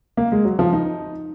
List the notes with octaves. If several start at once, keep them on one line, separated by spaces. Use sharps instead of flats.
A#3
G#3
F#3
F3
D#4